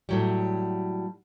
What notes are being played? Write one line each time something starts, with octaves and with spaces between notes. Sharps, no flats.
A2 F#3 G3